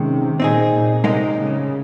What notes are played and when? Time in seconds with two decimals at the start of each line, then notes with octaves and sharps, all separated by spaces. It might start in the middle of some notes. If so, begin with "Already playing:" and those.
Already playing: C3 D#3 G#3 C#4
0.40 A#2 C4 D#4 G#4
0.72 A#2
1.04 C3 G#3 D#4 A#4 D#5
1.36 C#3